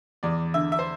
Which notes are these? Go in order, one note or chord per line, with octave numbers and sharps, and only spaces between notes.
E2 D5
D3 E5
E5
C5